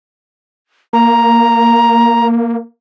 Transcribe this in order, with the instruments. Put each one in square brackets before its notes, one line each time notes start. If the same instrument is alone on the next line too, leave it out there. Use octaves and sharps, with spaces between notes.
[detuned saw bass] A#3 [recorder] A#5